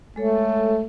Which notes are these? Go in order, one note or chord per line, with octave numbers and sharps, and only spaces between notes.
G#3 A3 A4 C#5